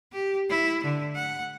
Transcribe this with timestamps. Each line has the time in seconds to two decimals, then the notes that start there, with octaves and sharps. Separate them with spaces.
0.13 G4
0.50 E4
0.84 D3
1.15 F#5